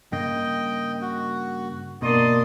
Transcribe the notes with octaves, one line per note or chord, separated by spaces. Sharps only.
G2 C#3 A#3 D#5 G5
F#4
B2 A#3 D4 D5 D#5 C6 D#6